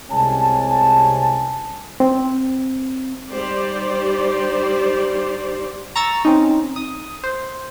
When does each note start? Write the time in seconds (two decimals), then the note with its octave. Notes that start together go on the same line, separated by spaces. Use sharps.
0.11 C2 C3 G#3 C#4 G#5 A5
2.00 C4
3.32 G3 D#4 G4 C5 D5
5.96 A#5 C#6 E6 A6
6.25 C4 C#4 D#4
6.76 D#6
7.24 C5